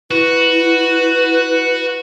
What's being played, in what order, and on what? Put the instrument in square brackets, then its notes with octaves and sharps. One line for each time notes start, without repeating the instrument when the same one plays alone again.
[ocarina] E4 [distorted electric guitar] F#4 [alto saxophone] B4